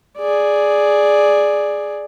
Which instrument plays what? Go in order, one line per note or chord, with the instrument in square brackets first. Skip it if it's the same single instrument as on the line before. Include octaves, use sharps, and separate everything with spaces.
[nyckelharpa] G#4 D5